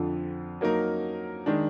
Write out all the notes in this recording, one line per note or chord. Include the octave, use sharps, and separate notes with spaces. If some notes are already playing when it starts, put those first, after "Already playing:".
Already playing: F2 D3 F3
F#3 A#3 D#4 A#4
D#3 G#3 D4